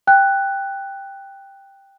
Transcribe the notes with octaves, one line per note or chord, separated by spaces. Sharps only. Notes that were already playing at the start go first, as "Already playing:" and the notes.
G5 F#6